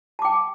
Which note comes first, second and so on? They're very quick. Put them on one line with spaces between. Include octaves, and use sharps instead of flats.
A5 D6 G5